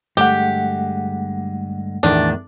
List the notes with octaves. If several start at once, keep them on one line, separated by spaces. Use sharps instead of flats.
G2 D3 G#3 A3 G4 F#5
E2 A2 D#3 D4